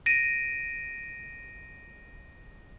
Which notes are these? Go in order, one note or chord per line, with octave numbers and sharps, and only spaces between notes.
A#6 D7 D#7